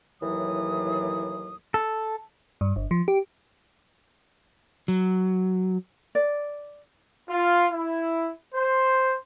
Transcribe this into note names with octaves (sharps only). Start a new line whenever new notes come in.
D#2 A2 E3 F#3 D#6
A4
G2
G1
F3
G4
F#3
D5
F4
E4
C5